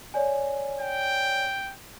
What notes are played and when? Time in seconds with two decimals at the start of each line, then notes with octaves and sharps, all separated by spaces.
0.14 C#5 D5 G#5
0.81 G5